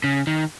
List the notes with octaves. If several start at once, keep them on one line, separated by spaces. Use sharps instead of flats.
C#3
D#3